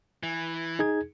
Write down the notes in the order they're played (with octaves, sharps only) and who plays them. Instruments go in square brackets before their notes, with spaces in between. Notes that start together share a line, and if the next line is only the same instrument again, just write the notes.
[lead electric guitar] E3
[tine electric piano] D#4 G#4 G#6